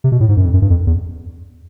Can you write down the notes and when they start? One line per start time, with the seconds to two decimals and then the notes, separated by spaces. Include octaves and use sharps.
0.04 C3
0.12 B2
0.20 A2
0.29 G#2
0.37 F#2
0.45 F2
0.54 F#2
0.62 G2
0.70 F2
0.87 E2